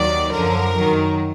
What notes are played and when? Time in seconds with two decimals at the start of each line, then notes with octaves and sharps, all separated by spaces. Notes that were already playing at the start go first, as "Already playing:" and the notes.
Already playing: D#2 D#3 F#3 D5
0.31 F#2 D3 F3 A#4
0.76 F#2 D#3 F#3